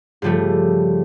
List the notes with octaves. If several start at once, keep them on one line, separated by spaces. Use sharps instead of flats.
G2 C#3 F3 G3 A3